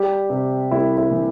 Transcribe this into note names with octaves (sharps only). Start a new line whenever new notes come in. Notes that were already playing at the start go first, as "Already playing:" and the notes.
Already playing: G3 G4
C3
C2 E4
E4
E3